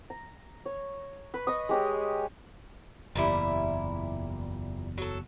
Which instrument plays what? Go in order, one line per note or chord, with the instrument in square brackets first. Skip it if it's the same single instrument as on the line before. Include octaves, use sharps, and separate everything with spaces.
[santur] A#5
C#5
B4 B5
D#5 C#6 D#6
G#3 G4 C#5
[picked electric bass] F#1 E2 [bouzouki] A#2 G3 E4
[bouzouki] F#3 A4